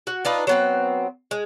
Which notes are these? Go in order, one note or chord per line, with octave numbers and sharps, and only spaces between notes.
F#4
D4 D#4 F4 B4
F#3 B3 C4
G#3